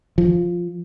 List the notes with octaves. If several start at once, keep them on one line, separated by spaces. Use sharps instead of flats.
F3